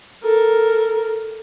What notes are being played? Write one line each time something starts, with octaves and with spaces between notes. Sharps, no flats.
A4 A#4